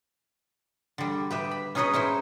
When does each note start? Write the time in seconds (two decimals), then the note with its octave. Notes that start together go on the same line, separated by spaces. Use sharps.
0.98 D3 G3
1.31 G4 B4 E5
1.51 B5
1.75 C#4 D#4 G#4 B4 C#5 D#5
1.93 C#4 D#4 E4 C5